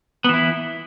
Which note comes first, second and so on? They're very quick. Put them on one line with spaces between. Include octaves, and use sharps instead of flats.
B3 E3 E4